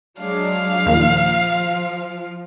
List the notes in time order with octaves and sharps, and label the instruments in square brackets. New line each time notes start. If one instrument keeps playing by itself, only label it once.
[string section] F#3 G#3 D4 [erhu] F5
[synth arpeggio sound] D#2 A#2 [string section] F3